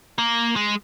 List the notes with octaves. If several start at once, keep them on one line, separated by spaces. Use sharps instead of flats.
A#3
G#3